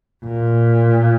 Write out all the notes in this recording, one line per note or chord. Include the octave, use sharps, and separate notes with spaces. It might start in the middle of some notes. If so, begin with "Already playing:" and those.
A#2